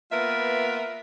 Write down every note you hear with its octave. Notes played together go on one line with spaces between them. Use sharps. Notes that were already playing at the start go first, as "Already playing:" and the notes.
A#3 B3 F4 A#4 B4 E5